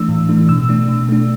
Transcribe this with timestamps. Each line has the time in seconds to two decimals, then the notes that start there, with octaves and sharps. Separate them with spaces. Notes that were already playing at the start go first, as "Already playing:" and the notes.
Already playing: E3 A3 D4 E6
0.09 A2
0.29 E3 A3 D4
0.49 B2 E6
0.69 A3 D4
0.89 B2
1.08 A3 D4